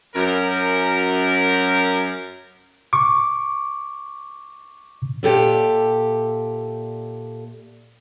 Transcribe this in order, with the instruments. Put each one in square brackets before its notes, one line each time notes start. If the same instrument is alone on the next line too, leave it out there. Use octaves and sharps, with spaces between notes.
[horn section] F#2 A#4
[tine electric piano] C#6 D6
[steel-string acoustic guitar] A#2 G4 A4 E5